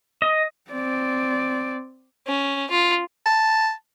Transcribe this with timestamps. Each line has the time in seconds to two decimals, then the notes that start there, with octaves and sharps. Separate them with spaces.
0.22 D#5
0.71 C4 D5
2.27 C#4
2.70 F4
3.26 A5